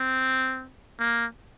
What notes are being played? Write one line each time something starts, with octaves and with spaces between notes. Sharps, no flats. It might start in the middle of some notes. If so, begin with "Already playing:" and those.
Already playing: C4
A#3